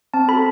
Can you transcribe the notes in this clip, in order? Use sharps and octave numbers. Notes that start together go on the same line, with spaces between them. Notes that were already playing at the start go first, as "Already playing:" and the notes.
C4 A5
F#4 A4 B5